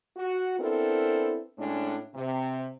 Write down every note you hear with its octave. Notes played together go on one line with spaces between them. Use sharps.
F#4
B3 C4 D4 E4 A4 A#4
A2 G#3 C#4 D4
C3